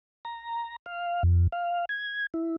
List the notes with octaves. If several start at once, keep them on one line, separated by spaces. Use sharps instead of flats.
A#5
F5
F2
F5
G#6
E4